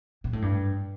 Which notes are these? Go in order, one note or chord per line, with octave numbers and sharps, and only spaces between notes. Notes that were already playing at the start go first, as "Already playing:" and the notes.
A#2
A2
G2